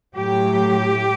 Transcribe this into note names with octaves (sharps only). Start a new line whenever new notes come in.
A2 F#3 G4